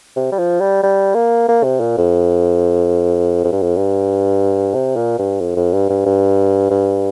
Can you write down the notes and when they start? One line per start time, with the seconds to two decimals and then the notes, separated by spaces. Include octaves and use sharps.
0.16 C3
0.32 G3
0.39 F3
0.61 G3
0.83 G3
1.15 A#3
1.48 A#3
1.64 C3
1.80 A#2
1.97 F2
3.44 F2
3.52 G2
3.62 F2
3.77 G2
4.74 C3
4.96 A#2
5.19 G2
5.40 F2
5.56 F2
5.73 G2
5.89 G2
6.06 G2
6.71 G2